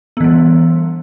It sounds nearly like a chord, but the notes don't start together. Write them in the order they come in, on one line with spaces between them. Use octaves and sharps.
B3 E3 G3